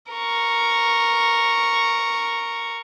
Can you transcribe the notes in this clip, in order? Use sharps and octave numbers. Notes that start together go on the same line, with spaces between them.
A#4 C#6